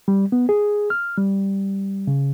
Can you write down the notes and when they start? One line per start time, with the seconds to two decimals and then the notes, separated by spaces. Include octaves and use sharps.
0.08 G3
0.32 B3
0.49 G#4
0.90 F6
1.18 G3
2.07 C#3